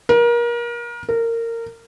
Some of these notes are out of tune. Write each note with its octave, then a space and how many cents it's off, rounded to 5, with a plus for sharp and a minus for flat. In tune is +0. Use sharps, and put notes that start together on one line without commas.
A#4 +30
A#4 -20